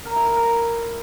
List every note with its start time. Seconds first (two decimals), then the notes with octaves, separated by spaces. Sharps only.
0.05 A#4
0.16 E4
0.26 A#4
0.36 A#4